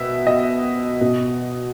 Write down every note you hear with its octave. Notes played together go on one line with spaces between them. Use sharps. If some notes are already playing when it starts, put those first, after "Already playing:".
Already playing: B2 E5
D#5
B2